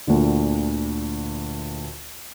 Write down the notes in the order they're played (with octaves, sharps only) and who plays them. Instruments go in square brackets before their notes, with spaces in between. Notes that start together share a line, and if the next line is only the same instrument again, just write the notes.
[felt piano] D2 A#2 D3